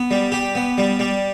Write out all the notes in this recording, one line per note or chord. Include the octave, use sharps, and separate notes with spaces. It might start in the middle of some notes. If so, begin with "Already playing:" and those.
Already playing: B3
G3
G4
B3
G3
G3